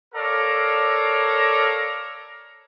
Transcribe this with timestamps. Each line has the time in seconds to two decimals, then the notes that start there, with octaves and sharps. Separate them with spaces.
0.14 A4 A#4 C#5 D5 F5 A#5